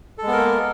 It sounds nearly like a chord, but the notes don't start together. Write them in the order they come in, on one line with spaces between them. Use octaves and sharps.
A4 G#3 B3 A#4 A#3